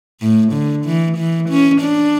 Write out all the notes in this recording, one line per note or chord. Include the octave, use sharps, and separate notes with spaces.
A2
D3
E3
E3
C#4
D4